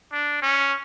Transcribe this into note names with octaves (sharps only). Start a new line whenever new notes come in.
D4
C#4